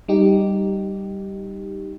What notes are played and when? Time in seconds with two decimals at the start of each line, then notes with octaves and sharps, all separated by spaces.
0.08 G3 D#4 G4